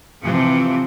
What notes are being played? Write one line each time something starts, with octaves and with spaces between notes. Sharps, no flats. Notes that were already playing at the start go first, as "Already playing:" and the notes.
C3 E3 F3